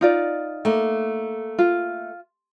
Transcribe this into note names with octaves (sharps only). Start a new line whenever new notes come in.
D#4 F4 D5
A3 A#3
F4